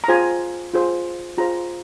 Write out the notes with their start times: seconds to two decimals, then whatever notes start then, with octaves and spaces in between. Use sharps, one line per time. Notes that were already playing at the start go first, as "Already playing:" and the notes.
0.04 A#5
0.08 F4 G#4 C5 G#5
0.74 F4 G#4 C5
1.38 F4 G#4 C5 A#5